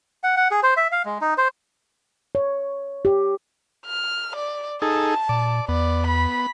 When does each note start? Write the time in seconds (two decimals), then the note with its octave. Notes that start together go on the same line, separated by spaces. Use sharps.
0.23 F#5
0.37 F#5
0.51 G#4
0.63 C5
0.77 E5
0.92 F5
1.05 G#3
1.21 D#4
1.38 C5
2.35 C#5
3.05 G4
3.86 F6
4.36 D5
4.82 D#4 G#4 A4 A5
5.29 A#2 D5
5.68 E2 B3 D5
6.07 B5